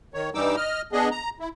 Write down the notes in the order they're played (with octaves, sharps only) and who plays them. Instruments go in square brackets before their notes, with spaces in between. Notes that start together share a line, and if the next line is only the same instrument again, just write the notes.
[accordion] D#3 C#5
G2 E3 G3 D#4 D6 E6
D#5 F6
B3 D4 G#4 D#5
A#5
E4